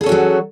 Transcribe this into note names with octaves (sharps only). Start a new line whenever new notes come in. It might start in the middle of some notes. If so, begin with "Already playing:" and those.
F#3 C#4 F#4 G#4 A4